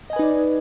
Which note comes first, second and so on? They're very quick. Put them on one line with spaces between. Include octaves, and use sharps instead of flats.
D#5 G#5 B4 D#4 D5